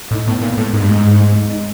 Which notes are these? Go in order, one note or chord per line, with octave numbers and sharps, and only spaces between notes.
A2 D#4
A2 B3
A#2 D#4
A2 G#3
G#2 G#3
G2
G#2 G#3
D#4
G#3
G#3
D#4